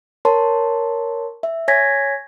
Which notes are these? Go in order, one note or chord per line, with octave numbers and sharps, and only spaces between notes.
A#4 C#5 A5 C6
E5
C#5 G#5 G#6 A#6 B6